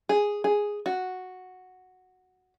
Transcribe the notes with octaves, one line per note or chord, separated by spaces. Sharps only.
G#4
G#4
F#4